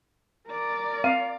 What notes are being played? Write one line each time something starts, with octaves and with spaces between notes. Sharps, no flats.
A#4 D5
C4 F5